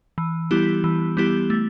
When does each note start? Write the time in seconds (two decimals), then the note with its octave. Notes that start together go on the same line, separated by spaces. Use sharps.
0.18 E3
0.51 G3 B3 E4 G4
0.84 E3
1.17 G3 B3 E4 G4
1.50 A3